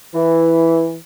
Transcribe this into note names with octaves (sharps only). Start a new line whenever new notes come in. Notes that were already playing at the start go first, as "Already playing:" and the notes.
E3